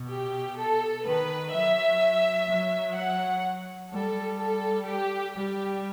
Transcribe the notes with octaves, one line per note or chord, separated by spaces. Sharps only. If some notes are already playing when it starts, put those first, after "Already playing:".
Already playing: B2
G4
A4
D#3 B4
F#3 E5
F#3
F#5
G3 A4
A4
G4
G3 G4